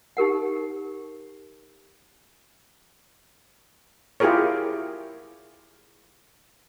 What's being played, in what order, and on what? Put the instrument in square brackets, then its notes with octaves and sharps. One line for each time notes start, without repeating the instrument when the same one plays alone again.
[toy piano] D#4 G4 A#4 F#5
[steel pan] E4 F4 G4 G#4 A#4 C#5